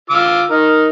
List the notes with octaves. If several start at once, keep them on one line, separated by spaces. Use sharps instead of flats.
F4 D6 E6
D#4 A#4